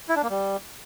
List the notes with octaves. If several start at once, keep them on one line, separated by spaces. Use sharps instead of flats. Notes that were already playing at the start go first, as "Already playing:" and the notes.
E4
D4
A#3
G3